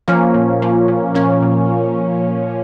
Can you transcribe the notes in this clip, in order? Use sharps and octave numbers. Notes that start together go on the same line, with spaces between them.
F3 A#3 C#4
A#2
F3
A#2
A#2 A#3 C#4
A#2